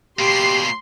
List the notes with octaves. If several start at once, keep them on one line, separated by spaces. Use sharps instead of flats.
B2 A#3 G4 C6 C7